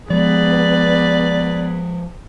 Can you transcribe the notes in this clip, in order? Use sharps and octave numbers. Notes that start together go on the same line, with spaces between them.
F3 G#3 B3 G#4 B4 D5